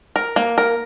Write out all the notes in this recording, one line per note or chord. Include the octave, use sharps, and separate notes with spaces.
A#4
A#3
A#4